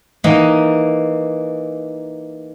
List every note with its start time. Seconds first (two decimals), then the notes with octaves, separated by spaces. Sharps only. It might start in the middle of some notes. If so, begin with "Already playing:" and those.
0.24 E3 A#3 D#4 D#5 F#5